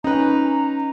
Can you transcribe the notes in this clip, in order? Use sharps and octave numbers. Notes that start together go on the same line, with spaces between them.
C#4 D#4 B4 A#5